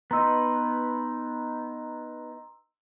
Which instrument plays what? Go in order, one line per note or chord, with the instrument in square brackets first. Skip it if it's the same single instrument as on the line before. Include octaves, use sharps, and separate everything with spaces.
[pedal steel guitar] B3 D#4 B4 [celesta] A#5 C6 E6